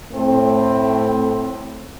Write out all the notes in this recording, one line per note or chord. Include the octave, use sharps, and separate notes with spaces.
A2 A3 C4